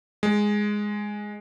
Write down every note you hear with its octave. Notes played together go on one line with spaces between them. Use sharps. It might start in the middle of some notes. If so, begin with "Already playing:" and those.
G#3